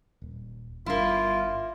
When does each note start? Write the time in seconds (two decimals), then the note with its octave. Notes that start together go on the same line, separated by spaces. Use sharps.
0.22 D#1
0.86 G1 G3 A#3 D4 E4 F4